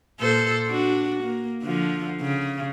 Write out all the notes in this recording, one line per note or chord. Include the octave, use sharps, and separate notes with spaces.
A#2 A4 C5
D4 F#4
A#3
D3 F3
C#3